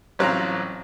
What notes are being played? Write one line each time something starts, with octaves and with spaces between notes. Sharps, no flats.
A1 F#3 C4 F4 A#5